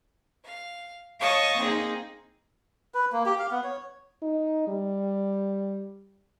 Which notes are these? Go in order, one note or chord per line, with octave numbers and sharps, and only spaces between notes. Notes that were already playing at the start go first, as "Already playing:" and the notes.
F5
C#5 D#5 F5 A5 C#6 D#6
A#3 C4 D#4 G#4
B4
A#3
G4
F5
B3
C#5
D#4
G3